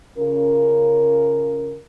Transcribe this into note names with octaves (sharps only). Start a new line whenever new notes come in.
C#3 C#4 F4 A#4